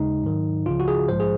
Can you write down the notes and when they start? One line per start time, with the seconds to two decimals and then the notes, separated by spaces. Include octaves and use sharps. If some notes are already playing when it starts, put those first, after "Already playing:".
Already playing: D#2 C#3 G#3 D#4
0.24 G#2 D#3 F#3
0.66 C#2 C#3 F3 F4
0.80 F#4
0.88 G#4
1.08 A#1 G#2 F3 G#3 C5
1.20 G#4